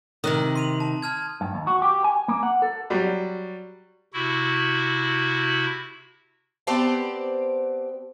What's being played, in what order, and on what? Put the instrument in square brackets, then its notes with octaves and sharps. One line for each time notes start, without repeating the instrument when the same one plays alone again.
[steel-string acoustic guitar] C3 D#3 [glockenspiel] D#6 F#6 F#7
[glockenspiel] C6 D#7 F7
A5
A5 F6 G#6
[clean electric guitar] G2
D#2
F#4
G4
G#5
A#3
F#5
A4
[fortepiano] F#3 G3
[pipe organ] C3 E4 F#4
[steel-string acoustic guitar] B3 C4 G4 C5 D5 A5